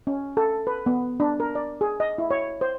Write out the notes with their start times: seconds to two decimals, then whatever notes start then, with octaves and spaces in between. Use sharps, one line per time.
0.07 C#4
0.37 A4
0.67 B4
0.86 B3
1.20 D4
1.40 A#4
1.55 D5
1.81 G#4
2.00 D#5
2.18 E4
2.31 C#5
2.61 C5